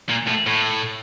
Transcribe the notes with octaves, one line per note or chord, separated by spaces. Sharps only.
A#2
A2
A2